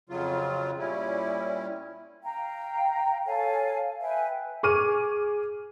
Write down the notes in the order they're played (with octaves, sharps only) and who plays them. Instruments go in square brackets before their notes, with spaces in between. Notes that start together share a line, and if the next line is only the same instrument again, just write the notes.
[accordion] F2 C#3 F#3 F4
A#2 G3 C#4 E4
[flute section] F5 G5 A#5
A4 C#5 F5 G#5
B4 E5 G5 G#5
[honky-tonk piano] G#4 C#6 D6 F6 D#7